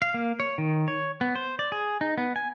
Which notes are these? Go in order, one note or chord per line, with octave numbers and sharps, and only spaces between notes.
F5
A#3
C#5
D#3
C#5
B3
C5
D5
G#4
D#4
B3
G#5